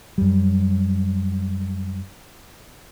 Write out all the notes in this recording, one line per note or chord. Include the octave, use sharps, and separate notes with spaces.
F#2 G3